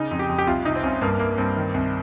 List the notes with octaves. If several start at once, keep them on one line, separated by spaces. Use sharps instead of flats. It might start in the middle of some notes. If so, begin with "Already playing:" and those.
Already playing: C#3 D#4
F2
G4
F2
G4
C2 F4
C3 D#4
C4
C2 C#4
G2 A#3
G2 A#3
G2 C4
D#3
C2